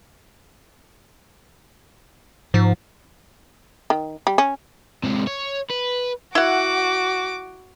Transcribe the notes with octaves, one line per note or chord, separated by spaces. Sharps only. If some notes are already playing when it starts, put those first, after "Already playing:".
G#2 F3
D#3
G3
C#4
C3 G#3
C#5
B4
E4 F#4 F#5 D6